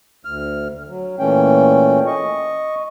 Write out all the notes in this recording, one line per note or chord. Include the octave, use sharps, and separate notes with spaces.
D2 F6
F#3
A#2 E3 A3 C#4 G5
D#5 C#6